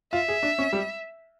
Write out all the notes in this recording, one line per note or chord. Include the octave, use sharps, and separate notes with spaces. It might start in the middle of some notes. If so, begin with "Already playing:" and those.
F4 E5
G#4
D4
C#4
G3